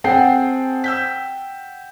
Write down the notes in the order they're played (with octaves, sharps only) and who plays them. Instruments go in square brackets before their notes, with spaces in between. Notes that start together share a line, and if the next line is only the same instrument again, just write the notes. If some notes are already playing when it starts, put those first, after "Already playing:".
[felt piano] C4 G#4 A5 [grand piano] F#5 G5 C7
[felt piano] E6 G6 B6